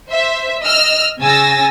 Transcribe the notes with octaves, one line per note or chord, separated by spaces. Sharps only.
C5 E5
D#5 E6 F6
C#3 G#5 E6 A6 A#6